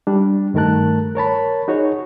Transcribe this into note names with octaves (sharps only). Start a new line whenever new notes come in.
G3 D4
G2 D#3 A3 A#4 A5 F#6
A#4 C#5 A5 B5
D#4 F#4 G#4 C#5